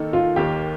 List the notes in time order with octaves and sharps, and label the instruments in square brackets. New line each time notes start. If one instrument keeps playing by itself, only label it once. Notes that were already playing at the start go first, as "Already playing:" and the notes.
Already playing: [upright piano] D#3 A#3 D#4 A4
[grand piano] F4
[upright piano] D#2 D#3 A#3 [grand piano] G4